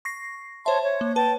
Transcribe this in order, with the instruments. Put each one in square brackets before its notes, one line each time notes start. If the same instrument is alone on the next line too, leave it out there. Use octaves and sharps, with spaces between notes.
[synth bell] C#6 A#6 C7
[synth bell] C5 E5 [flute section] C#5 A5 C6
[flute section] C#5
[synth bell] A#3
[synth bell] B4 [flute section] G5 A5